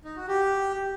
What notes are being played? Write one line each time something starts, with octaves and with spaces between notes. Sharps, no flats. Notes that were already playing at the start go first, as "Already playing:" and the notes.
D#4
F#4
G4